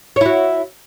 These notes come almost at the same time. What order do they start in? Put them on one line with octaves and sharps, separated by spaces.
C#5 E4 F#4